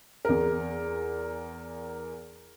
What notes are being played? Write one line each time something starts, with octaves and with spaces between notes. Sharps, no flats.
E2 A#4